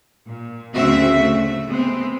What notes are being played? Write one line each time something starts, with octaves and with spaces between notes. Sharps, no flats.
A#2
D2 C#3 C4 F#4 E5
A3
G#3 B3 C4